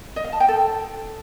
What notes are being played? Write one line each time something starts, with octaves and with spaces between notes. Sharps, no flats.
D#5
F5
A5
G5
A4